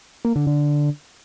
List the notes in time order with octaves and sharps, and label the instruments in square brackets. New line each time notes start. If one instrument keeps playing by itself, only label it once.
[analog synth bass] A#3
D3
D3